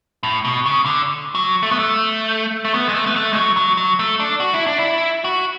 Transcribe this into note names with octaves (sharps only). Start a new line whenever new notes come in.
A2
B2
C#3
D3
F#3
A3
B3
A3
A3
B3
G#3
A3
B3
A3
G#3
F#3
F#3
F#3
A3
D4
F#4
E4
D4
E4
F#4